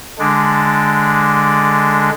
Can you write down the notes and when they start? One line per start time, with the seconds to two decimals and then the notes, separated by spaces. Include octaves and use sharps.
0.19 D3 G#3 D4